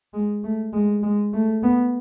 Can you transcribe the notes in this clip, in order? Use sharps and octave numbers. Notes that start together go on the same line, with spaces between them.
G#3
A3
G#3
G#3
A3
B3